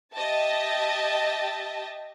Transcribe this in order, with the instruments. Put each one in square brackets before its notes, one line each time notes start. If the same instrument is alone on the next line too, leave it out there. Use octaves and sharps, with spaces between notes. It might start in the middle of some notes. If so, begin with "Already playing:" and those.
[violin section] G4 D#5 E5 A5